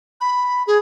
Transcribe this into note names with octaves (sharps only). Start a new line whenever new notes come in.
B5
G#4